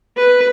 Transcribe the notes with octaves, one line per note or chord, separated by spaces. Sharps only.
B4